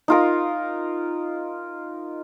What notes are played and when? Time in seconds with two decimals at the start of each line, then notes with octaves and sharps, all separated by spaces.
0.08 D#4 F4 A#4